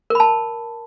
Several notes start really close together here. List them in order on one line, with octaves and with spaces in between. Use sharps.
A#4 B5 A5